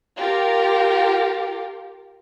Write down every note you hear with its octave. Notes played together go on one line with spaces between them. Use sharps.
F4 G4 A#4